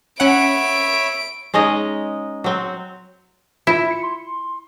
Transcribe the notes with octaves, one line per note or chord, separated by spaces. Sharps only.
C#4 C#5 E5 F#5 B5 D7
G#3 C#4 D#4 D#5
F#3 C4
E4 F4
C#7
C6